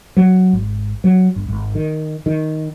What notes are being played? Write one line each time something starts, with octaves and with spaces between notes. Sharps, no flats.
F#3
G#1
F#3
G1
G#1
D#3
D#3